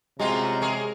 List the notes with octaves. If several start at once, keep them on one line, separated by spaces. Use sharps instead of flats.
C3 G#3 C#4 F4 F#4 A#5 C6
G#4 A#4 C#5